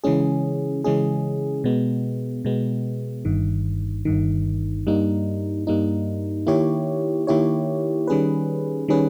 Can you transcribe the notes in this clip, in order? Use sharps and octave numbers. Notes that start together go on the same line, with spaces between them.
C#3 E3 G#3 C#4 G#4
C#3 E3 G#3 C#4 G#4
B2 G#3 B3
B2 G#3 B3
G1 G2 D#3
G1 G2 D#3
G2 G3 A#3 D#4
G2 G3 A#3 D#4
D#3 A#3 E4 G4 C#5
D#3 A#3 E4 G4 C#5
D#3 G3 C#4 G#4 B4
D#3 G3 C#4 G#4 B4